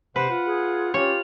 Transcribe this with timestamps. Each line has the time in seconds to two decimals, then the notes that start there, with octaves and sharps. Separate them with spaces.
0.16 C3 B4 C5 F#5
0.29 F4 F#5
0.46 G#4
0.94 C#4 F4 G4 C#5